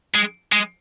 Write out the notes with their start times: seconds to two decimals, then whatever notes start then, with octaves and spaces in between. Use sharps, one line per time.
0.15 G#3
0.52 G#3